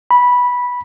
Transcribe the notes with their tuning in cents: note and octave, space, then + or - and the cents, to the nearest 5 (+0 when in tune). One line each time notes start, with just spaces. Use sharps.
B5 -10